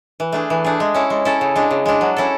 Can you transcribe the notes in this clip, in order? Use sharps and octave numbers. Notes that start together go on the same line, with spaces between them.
E3
A3 D4 G#4
E3
A3 D4 G#4
G#3
C#4 E4 A4
G#3
C#4 E4 A4
C#3
G#3 D4
C#3
G#3 D4
F#3
C#4 E4 A4